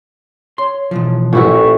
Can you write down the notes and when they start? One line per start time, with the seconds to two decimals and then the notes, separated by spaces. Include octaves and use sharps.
0.58 C#5 C6
0.91 B2 E3 F3
1.33 A1 A#2 E4 F#4 C#6